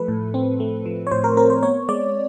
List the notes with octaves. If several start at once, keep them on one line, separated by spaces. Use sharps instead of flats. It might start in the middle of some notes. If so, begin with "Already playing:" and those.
Already playing: F3 A3 A4 B4
A2
C4
A3
F3
C#5
A2 C5
A#4
C4 A#4
C5
B3 C#5
G#3 D5